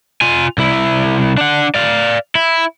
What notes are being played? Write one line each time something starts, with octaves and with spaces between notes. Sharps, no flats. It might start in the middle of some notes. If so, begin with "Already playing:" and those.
F4 G#5
C2 E4
D4 F#5
D5 F5
E4